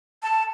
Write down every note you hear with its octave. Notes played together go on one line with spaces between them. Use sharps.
A5